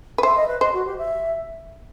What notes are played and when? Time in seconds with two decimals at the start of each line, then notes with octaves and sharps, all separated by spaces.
0.18 B4
0.23 C5 E5
0.36 D#5
0.48 B4
0.61 C5 D#5
0.73 F#4
0.86 G4
0.98 E5